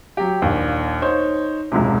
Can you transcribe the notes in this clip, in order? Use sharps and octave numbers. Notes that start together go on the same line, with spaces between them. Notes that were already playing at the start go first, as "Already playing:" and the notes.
F#3 G4
A#1 D#2
D#4 C5 C#5
E1 C#2 G#2 C3